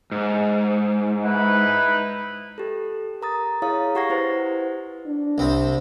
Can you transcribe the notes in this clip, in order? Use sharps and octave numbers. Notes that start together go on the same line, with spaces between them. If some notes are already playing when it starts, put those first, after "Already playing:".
G#2
D#4 E4 B4
G4 A4
A#4 A#5 D#6 A6
E4 G#4 C#5 F5 A#5 D#6
G4 F#5 C#6 G#6 A#6 C7
E4 B4 C5
D4
C2 C4